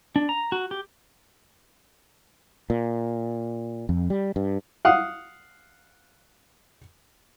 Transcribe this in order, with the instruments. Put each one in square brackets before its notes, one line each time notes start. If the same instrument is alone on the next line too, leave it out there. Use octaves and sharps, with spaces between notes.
[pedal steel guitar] D4
A#5
F#4
G4
[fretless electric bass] A#2
F2
G3
G2
[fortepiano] F5 F#5 D#6